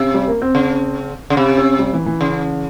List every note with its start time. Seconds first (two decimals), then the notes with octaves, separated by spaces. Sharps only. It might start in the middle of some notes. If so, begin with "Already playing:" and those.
Already playing: C3
0.14 G3
0.28 A#3
0.42 C4
0.55 C#3
1.30 C#3
1.37 C3
1.58 C#4
1.79 G3
1.93 E3
2.06 E3
2.21 C#3